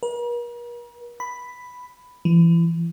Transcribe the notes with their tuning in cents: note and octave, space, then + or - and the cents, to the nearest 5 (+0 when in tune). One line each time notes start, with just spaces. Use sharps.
A#4 +45
B5 +5
E3 +35